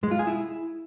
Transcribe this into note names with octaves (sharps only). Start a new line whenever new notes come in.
G#3
F4
G#4
E4